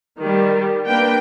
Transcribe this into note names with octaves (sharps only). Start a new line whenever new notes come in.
D#3 G3
A#3 D4 B4 G5